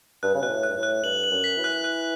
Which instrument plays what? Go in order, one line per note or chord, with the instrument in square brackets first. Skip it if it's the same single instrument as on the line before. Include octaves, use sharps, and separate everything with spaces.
[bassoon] G2 [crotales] F#6
[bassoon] C#3
[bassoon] B2 [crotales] F#6
[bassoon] A2
[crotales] F#6
[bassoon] G2
A2
[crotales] F#6
[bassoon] G2 [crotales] F#7
[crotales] F#7
[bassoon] F#2
[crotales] B6
[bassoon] E3
[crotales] F#6
F#6